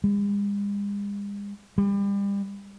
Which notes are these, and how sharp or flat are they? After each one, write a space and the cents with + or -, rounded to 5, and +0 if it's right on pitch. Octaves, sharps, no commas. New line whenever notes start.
G#3 -45
G3 +30